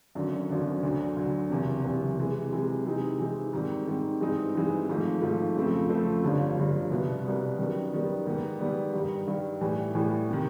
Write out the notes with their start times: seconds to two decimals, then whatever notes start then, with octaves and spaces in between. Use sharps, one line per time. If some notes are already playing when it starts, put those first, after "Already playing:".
0.15 G#1 F#2 D3
0.49 G#1 F#2 D3
0.83 D2 D3 F#3
1.17 D2 D3 F#3
1.50 F#1 E2 C3
1.84 F#1 E2 C3
2.18 C3 E3 G#3
2.52 C3 E3 G#3
2.86 C3 E3 G#3 C4 D#4
3.19 C3 E3 G#3 C4 D#4
3.53 G#2 D#3 G3 C4
3.87 G#2 D#3 G3 C4
4.21 G2 E3 G#3 C4 D#4
4.54 G2 E3 G#3 C4 D#4
4.88 G#1 G#2 F3 A3
5.22 G#1 G#2 F3 A3
5.56 F2 C#3 F3 A3 C4
5.90 F2 C#3 F3 A3 C4
6.23 G1 G2 D3 F3
6.57 G1 G2 D3 F3
6.91 C2 B2 G3 B3
7.24 C2 B2 G3 B3
7.58 F#2 D#3 G3 B3
7.92 F#2 D#3 G3 B3
8.26 G#2 D#3 G3 B3
8.59 G#2 D#3 G3 B3
8.93 G2 D#3 G3
9.27 G2 D#3 G3
9.61 A2 E3 G3
9.95 A2 E3 G3
10.30 C3 D#3